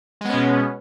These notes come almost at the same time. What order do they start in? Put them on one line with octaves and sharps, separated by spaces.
G#3 B3 C#4 B2